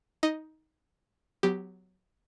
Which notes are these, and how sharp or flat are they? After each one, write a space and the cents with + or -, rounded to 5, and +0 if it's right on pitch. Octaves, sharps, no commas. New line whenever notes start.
D#4 +15 D#5 +0
F#3 +0 B3 +25 G4 +0